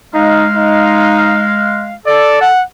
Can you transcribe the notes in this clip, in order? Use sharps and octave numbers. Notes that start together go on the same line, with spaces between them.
G#3 D#4 F5
D#4
A4 D5
F#5